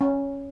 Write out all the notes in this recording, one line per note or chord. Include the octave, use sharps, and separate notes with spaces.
C#4